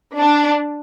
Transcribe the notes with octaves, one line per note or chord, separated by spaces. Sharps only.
D4